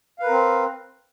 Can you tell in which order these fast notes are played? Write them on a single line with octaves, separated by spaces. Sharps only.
F5 B4 A#4 C4